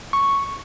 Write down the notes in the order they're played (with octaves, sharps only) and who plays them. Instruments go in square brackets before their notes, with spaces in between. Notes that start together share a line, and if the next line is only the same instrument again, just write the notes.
[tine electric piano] C#6